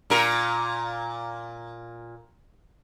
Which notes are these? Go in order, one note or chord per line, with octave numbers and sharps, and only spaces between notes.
A#2 A#4